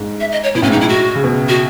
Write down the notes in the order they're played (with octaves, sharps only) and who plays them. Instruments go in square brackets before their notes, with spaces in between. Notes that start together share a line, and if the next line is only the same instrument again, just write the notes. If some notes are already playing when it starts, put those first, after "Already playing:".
Already playing: [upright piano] G#2
[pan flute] E5
D#5
C#5
[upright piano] B2 [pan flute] E4
[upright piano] A2 [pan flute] C#4
[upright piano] G#2
[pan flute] D#4
[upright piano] A2 [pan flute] E4
[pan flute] F#4
[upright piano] C#3
B2
[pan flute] F#4